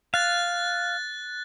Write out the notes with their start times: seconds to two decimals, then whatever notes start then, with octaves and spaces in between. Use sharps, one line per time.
0.14 F5 F#6 A6